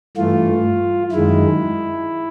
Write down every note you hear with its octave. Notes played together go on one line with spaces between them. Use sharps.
G2 E3 A3 F4
F#2 D#3 G#3 E4